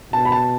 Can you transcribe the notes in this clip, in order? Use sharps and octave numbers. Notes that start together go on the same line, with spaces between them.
B2 A5
B5
A5